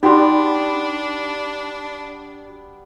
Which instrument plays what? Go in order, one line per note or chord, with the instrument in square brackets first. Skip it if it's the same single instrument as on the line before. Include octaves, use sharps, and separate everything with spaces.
[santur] G3 B3 [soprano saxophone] D4 [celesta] D#4 G5 C6 [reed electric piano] F#4 G4